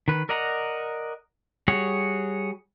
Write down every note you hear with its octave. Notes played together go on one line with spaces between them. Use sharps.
D#3 B4
A#4 D5 D#5 F#5 A#5
G3 F#4 G#4 C#5